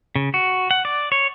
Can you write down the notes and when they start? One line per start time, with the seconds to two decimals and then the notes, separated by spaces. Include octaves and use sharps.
0.16 C#3
0.34 F#4
0.71 F#5
0.85 D5
1.12 C#5